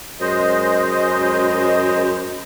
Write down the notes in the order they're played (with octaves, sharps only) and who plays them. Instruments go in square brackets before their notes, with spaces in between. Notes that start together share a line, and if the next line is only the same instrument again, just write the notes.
[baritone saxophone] F#2 [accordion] G#3 C5 D#5